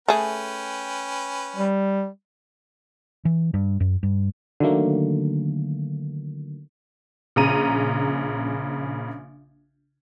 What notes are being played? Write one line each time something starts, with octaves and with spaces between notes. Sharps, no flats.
A3 C#4 G#4 B4 G5
G3
E3
G2
F#2
G2
D3 D#3 F#3 A3 A#3
A#1 C#3 A#5 D#7